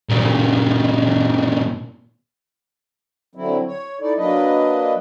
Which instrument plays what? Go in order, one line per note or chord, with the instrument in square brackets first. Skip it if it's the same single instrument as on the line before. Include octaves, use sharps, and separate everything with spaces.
[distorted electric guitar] A#2 C#3
[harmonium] D3 F#3 C4 E4
C#5
D#4 E4 A4 D5
F#3 A#3 D4 B4 D#5